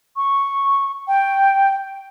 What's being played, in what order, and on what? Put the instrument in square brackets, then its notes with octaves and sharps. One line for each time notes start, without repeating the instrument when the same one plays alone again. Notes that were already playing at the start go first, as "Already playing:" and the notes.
[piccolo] C#6
G5